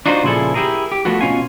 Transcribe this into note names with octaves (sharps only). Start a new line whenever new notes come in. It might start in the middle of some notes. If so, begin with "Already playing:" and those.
D4 D#4 F4 F#4 G#4 C5
A#2 C#3 F3 E4 G#4 A4
E4 G4 G#4 A#4
G4
F3 A3 B3 F#4
B2 C#4 F4 F5 G#5